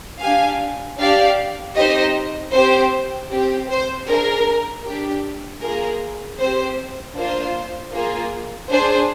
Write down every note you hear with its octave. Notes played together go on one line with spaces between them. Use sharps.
D4 G4 F5 G#5
D4 G4 D5 F5
C4 D#4 G4 C5 D#5
C4 G4 C5
C4 G4
C5
D4 G#4 A#4
D4 G4
A#3 F4 G#4 A#4
C4 G4 C5
A#3 D4 F4 C5
A#3 F4 G#4
D4 G#4 C5